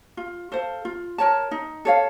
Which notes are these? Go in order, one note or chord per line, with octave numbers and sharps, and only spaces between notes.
F4
A4 C5 F5
F4
A#4 C#5 A5
D#4
A4 C#5 F5